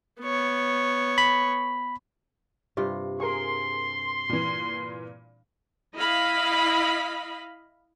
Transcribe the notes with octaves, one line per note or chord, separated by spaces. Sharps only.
B3 C#5
B5
G2 C3 F4
G#4 A#4 C6
A#2 E3
E4 D#5 F5 B5